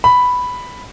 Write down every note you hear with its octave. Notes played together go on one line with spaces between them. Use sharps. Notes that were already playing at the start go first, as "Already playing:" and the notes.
B5